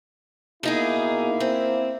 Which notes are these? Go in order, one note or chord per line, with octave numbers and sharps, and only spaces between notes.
B2 A#3 D#4 E4 G#4
C4